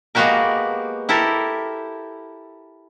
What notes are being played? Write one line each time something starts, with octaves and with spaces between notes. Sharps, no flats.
G#3 A#3 B3 F#4 G4 A#4
E4 G4 A4 A#4